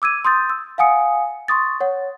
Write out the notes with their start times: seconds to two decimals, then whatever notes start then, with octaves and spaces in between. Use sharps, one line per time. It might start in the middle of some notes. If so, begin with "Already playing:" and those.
0.02 D6 E6 G#6 D#7
0.25 C6 D#6 G6 A6
0.50 E6
0.78 F5 F#5 G#5 D#6 C#7
1.48 C6 C#6 D#6 A6
1.80 C#5 F#5